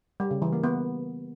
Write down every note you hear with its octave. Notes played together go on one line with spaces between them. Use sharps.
G3
C#3
E3
A#3
B3